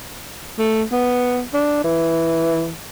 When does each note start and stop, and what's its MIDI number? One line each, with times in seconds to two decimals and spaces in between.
0.58 0.83 57
0.92 1.43 59
1.54 1.83 62
1.84 2.71 52